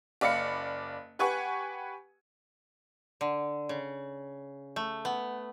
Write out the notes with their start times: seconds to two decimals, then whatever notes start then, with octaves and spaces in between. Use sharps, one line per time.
0.21 F#1 D5 F5 B5 C#7
1.19 G4 B4 F#5 G#5 C#6
3.21 D3
3.69 C#3
4.76 A3
5.05 B3